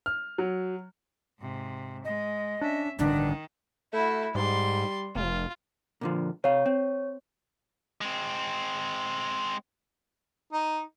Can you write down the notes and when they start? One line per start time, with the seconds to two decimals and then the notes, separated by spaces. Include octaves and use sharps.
0.06 F6
0.38 F#3
1.40 G#2 C3
2.05 G#3 D#5
2.61 C#4 D4 E5
2.99 A1 G2 D3 D#3 D4
3.93 A3 E4 F#4
4.35 G#2 G3 D5 C6
5.15 F1 F4
6.01 A#2 D3 F3
6.44 C3 C#5 F5
6.66 C4
8.01 G#3 C4
10.53 D#4